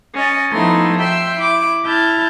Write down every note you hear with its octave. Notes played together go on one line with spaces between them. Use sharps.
C#4 D#5 A6
F3 A3 B3 D#4 E4 C6
E5 G5 C6 E6
E4 D6
E4 A5 F6 G6